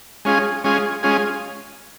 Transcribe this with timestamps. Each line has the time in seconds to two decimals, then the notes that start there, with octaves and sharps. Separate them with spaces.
0.25 G#3 C#4 F4 G#4
0.64 G#3 C#4 F4 G#4
1.03 G#3 C#4 F4 G#4